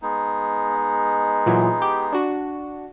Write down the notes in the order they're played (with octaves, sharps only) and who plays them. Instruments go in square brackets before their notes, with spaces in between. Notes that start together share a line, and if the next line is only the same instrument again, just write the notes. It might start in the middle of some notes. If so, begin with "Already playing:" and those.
[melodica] G#3 B3 D#4
[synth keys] A#2 E3 F#3
G4
D4 F#4